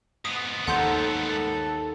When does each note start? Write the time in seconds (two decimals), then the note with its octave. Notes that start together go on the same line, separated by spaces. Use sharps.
0.25 G#2 B3 D#6
0.67 D#2 D#3 A4 F#5 C6 G6